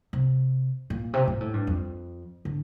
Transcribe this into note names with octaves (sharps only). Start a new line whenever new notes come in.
C3
A#2
C3
A#2
A2
G2
F2
D3